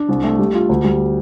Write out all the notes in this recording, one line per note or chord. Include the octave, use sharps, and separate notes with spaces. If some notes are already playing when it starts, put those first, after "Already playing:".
Already playing: D4
C2
A3
G3
F4
D2
G3